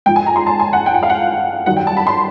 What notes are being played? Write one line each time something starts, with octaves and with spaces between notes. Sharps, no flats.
G#2 F3 G5
G#5
A#5
C6
A5
G#5
F#5
G5
F#5
F5
F#5
G2 D#3 F#3 F#5
G5
A5
B5
C6